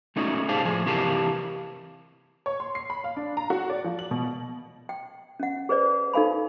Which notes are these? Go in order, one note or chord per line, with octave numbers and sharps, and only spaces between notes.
G#3 A3 C#4 D#4 F#4
G4 G#4 C5 F5 A5
A2 F3 G#4 G#5
C3 E3 G4 A#4 F5 A5
C#5
C6
C7
B5
F5
D4
A#5
F#4
D5
F3
F#7
B2
G5
C#4 F#5
G#4 B4 C5 D5
D#4 A4 F5 G#5 B5